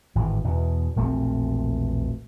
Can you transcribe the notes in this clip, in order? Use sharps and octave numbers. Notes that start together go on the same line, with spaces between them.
G#1 A2 E3
E2 B2 E3
E1 A#1 A3 C4